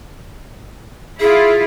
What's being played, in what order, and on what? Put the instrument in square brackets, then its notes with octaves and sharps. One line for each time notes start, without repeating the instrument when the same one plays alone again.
[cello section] E4 F4 [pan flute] G#4